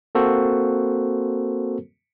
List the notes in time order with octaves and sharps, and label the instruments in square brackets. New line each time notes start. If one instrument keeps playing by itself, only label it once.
[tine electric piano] A#3 C4 F#4 A4 A#4 C5